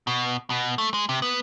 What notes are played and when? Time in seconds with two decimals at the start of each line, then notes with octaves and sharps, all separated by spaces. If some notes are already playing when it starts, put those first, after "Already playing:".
0.07 B2
0.50 B2
0.78 A3
0.94 G#3
1.09 C3
1.22 B3